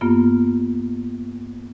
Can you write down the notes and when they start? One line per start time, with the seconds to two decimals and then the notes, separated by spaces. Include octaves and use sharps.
0.01 G2 A#3 B3 F4